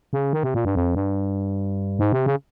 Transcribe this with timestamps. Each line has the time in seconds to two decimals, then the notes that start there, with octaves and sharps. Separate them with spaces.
0.13 C#3
0.33 D#3
0.43 C3
0.54 A#2
0.65 G2
0.75 F2
0.95 G2
1.99 G#2
2.12 C3
2.26 C#3